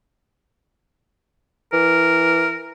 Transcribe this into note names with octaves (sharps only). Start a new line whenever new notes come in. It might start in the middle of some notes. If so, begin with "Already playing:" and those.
E3 A#4